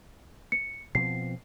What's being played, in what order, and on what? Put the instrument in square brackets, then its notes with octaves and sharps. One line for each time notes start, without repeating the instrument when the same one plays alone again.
[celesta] C#7
[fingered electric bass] B2 F3 C4 [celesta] C7